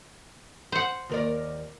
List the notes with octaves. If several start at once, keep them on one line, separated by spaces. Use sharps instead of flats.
C5 F#5
D#2 A#4 D5